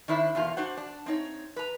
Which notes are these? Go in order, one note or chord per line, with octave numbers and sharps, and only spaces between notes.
D#3 D4 E4 C5 E5
E2 B2 A#3 F4
D4 F#4 C5 F#5
D4
C4 D#4 C#5
B4 A#5